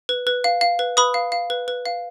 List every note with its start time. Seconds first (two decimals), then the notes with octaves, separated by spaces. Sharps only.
0.09 B4
0.27 B4
0.44 F5
0.61 F5
0.79 B4
0.97 B4 B5 D#6
1.14 F5
1.32 F5
1.50 B4
1.68 B4
1.86 F5